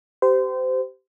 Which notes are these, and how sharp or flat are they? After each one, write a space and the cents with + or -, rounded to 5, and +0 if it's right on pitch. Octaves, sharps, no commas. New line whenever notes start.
G4 -20 C5 -25